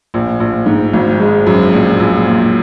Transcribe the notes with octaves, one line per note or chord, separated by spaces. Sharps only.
A#1
A#1
G#2
G#1
G#3
F#2
A#1
A#1
A#2